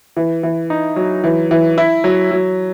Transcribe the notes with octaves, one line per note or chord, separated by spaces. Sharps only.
E3
E3
D#4
F#3
E3
E3
E4
F#3
F#3